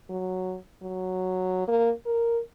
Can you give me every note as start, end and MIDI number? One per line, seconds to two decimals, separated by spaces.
0.10 0.57 54
0.83 1.65 54
1.68 1.91 58
2.06 2.39 70